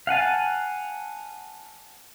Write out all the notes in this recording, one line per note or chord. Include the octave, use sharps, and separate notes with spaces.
F5 F#5 G#5 A5